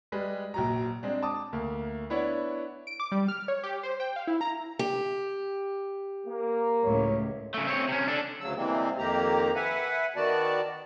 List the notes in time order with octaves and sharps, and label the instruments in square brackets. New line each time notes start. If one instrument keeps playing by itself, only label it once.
[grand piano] G3 G#3 B4
A#1 F#3 A#5
G#3 C4 D4
A5 D6 D#6
D2 A#3
B3 D4 E4 C#5
[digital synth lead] D7
D6
G3
F6
C#5
G4
C5
G5
F5
E4
A#5
[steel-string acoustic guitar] G4
[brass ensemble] A#3
[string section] C#2 A2 [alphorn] C#5
[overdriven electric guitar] C#3 A3
C4 C#5
C3 C#4
D4 A4
[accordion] D2 C#3 F#3 E6
C3 E3 G3 G#3 A#3 C4
F2 D#3 A#3 G4 A#5
B4 E5 F#5 G#5
D#3 B3 F#4 D5 A5